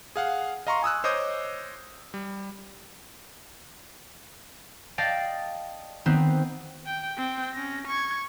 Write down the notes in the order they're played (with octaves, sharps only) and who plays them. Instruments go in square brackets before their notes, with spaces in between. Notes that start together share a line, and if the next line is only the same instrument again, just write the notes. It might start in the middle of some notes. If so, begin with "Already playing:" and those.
[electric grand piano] G#4 F5 F#5
D#5 F5 A#5 C6 C#6
G#5 D#6 E6 F#6
C5 C#5 D#5 D6 D#6 G6
G3
[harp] D5 D#5 F5 G5 A5 A6
D#3 B3 C4 B4 C5
[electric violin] G5
C4 G5
C#4 A#6
C#6 G#6